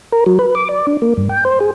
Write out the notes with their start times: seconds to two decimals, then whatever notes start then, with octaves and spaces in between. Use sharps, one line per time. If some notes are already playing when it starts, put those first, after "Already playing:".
0.12 A#4
0.26 F#3
0.39 B4
0.55 D6
0.69 D5
0.87 D4
1.02 A#3
1.17 G2
1.29 G5
1.45 C5
1.60 G#4